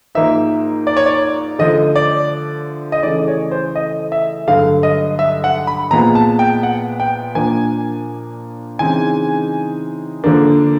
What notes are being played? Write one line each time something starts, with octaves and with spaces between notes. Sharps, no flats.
G#2 F3 A#3 D#4 E5
D5
C#5
D5
D3 F3 A3 D#5
D5
D#5
C#3 E3 A3 D5
C#5
C5
D#5
E5
G2 D3 F#3 A3 F5
D#5
E5
F#5
B5
A#2 F3 G#3 B3 A#5
A5
G5
F#5
G5
A#2 F3 A#3 D4 G#5
C#3 E3 G#3 C4 D#4 G#5
D3 F3 A#3 D4